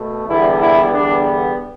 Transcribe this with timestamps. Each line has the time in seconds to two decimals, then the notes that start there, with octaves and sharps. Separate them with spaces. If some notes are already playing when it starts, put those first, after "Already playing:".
Already playing: B2 A3
0.26 E2 D3 G3 B3 E4
0.58 E4
0.89 E2 D3 G3 B3 D4